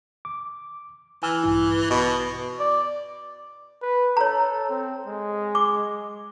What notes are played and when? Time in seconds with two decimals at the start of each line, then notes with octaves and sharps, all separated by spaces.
0.25 D6
1.23 E3 G#5 E6 F6
1.44 A#1 G2 E4
1.90 B2 D#5
2.60 D5
3.82 B4
4.17 A4 C#5 A#5
4.70 C4
5.06 G#3
5.55 D6